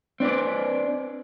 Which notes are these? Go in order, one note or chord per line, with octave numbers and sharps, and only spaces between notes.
C4 D4 B4 D5